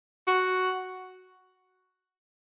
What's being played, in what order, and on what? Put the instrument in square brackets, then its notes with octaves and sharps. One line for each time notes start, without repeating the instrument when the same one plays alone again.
[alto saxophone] F#4